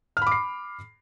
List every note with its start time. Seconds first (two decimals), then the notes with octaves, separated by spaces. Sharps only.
0.17 F6
0.22 B5
0.27 D6
0.32 C7